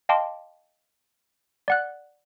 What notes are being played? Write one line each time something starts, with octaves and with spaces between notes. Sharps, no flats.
D#5 F5 G5 A5 C6 D6
D5 F#5 F#6